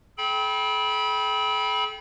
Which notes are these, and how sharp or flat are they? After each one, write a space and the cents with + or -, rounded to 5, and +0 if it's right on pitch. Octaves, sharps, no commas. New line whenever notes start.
A4 -45 G5 +0 B5 -20